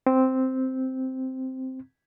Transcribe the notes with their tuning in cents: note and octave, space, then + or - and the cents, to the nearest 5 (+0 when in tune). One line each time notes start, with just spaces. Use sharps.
C4 -5